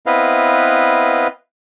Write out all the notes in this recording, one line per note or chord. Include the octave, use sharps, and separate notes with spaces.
B3 C4 E4 B4 D#5 F5